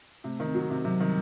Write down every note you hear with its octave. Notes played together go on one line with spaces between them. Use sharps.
C3 A3
D#3
C4
F#3
C3 C4
C3 F#3
D#3 G3